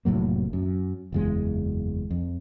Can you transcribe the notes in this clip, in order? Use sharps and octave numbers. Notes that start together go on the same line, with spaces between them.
F1 A2 F#3 A#3
F#2
F#1 E2 G#3
F2